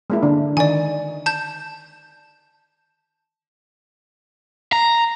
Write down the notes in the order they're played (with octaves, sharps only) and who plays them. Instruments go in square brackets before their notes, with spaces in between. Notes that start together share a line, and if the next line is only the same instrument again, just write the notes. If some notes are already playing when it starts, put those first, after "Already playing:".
[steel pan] G#3 A#3 E4
D3 D4
[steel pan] D#3 D#4 [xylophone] D5 G#5
[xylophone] A5 G6
[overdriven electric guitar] A#5